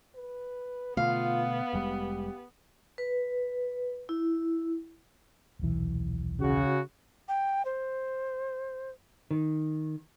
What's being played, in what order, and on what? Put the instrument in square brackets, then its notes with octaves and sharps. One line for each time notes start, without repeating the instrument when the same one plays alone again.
[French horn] B4
[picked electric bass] B2 D3 A3 [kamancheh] B3 [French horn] F4 [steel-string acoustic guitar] F5
[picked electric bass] F1 G3 G#3 [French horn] G4
[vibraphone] B4
E4
[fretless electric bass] D#1 B1 E3
[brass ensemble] C#3 F#4
[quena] G5
C5
[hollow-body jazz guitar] D#3